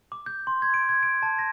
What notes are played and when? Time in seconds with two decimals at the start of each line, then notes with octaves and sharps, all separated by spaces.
0.12 D6
0.26 G6
0.47 C6
0.62 G#6
0.74 D7
0.89 G#6
1.03 D7
1.23 A5
1.39 A#6